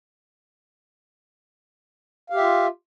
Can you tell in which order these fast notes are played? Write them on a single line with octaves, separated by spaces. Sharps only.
F5 G4 E5 F4